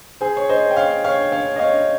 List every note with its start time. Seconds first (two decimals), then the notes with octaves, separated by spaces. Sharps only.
0.21 G#4 C5
0.37 C#5
0.49 C5 D#5
0.71 G5
0.76 C#5 F5
1.04 C#5 F5
1.32 C#5 F5
1.56 D#5
1.59 C#5 F5